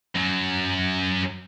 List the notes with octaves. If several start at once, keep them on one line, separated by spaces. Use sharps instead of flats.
F#2 F#3